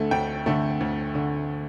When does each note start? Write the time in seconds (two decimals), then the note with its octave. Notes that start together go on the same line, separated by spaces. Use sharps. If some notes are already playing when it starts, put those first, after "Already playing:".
Already playing: D2 D3 A3
0.11 D2 G5
0.46 D3 A3
0.80 D2
1.15 D3